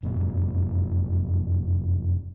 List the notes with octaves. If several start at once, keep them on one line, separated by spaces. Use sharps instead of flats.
F1 F#2 A#2